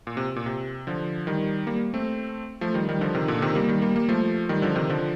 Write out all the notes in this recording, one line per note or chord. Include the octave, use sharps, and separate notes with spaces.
A#2
C3
A#2
C3
D3 F3
D#3 G3
G3 A#3
A3 C4
F3 A3
D#3 G3
D#3 G3
D3 F3
C3 D#3
A#2 D3
C3 D#3
G3 A#3
D#3 G3
G3 A#3
G3 A#3
F3 A3
D#3 G3
D3 F3
C3 D#3
D3 F3